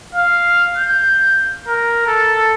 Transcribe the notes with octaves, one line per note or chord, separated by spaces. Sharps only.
F5
G6
A#4
A4